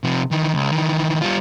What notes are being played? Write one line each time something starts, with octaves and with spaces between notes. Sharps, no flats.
C3 F3
D#3 E3
C#2
D#3 E3
G3 F4